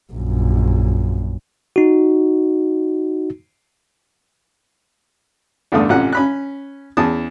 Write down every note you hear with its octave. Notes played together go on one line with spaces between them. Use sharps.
A#1 F#2
D#4 F#4
E2 G2 D3 A3 D#6
A1 C3 F3 C#4 F#5
C#4 B5 F#6
E2 C#4 G#4 A5 D#6